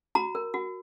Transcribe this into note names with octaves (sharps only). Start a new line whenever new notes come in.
F#4 A#5
A#4
F#4